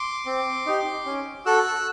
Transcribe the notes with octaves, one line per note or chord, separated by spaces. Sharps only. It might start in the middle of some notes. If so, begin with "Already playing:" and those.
Already playing: C6 D6
C4
D#4 G4
C#4
F#4 A4 E6 F#6